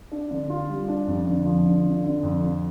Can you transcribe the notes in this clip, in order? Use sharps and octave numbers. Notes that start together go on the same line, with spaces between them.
D4
D3
F4
G3
D4
F2
D3
F3
D3
D3
D3
F2
F3